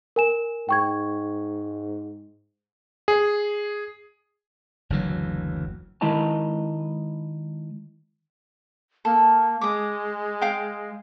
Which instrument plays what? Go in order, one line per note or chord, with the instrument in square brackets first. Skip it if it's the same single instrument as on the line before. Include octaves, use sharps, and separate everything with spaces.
[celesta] A#4 G#5 E7
[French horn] G#2 [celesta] G5 C#6 G#6
[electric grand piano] G#4
[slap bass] F#1 D2 E3 F#3
[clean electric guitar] D#3 G#3 E4 D#5 A5 A#5
[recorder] A#3 [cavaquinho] A4
[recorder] G#3 [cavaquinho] D6 D#6
[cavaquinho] F5 G5